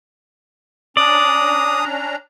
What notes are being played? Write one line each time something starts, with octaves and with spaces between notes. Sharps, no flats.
C#4 D4 D5 A#5 D#6